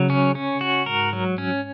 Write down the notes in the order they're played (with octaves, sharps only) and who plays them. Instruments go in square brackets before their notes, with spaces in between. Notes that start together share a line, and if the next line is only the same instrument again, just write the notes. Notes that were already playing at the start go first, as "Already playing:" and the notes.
Already playing: [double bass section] C#3 [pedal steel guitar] F#3
[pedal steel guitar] C#4
C#4
F#4
[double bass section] G#2 [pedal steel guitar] A#4
[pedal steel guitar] F#3
C#4